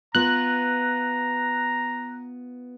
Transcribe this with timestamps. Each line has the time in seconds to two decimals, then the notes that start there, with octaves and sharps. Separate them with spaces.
0.15 B3 F4 A#5 F#6